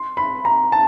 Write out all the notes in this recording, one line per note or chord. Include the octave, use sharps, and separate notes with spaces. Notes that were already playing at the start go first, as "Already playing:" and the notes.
Already playing: C6
B5
A#5
A5